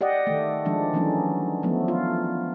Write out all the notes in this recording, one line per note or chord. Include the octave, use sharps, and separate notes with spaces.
G4 D5 D#5 F#5
D#3 A3
D#3 F3 G#3 D4
E3 F#3 A3 C#4 D#4
F3 F#3 A3 B3
F4